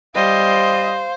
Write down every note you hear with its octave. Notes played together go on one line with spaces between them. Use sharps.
G3 C5 D#5 F5